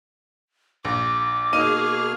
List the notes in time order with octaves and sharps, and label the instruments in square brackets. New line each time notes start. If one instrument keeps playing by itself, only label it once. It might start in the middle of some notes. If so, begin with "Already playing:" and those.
[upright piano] A#1 [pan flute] D6
[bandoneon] B2 A#3 F6 [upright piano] D#4 D#7 [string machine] G#4